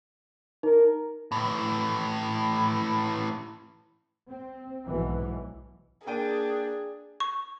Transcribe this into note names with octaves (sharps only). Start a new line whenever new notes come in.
D#4 A#4
A2 E3
C4
B1 G#2 B2 E3
A#3 D4 G#4 G5 D#7
C#6